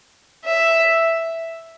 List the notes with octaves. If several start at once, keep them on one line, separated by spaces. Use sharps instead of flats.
E5